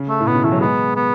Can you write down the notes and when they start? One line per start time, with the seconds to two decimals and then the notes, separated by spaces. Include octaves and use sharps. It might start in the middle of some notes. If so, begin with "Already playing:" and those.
Already playing: C#3
0.09 A3
0.20 A2
0.27 B2 B3
0.35 C#3
0.44 E3 A3
0.52 F#3
0.60 G#3 B3
0.96 B3